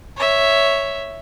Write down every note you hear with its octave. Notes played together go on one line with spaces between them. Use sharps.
C#5 E5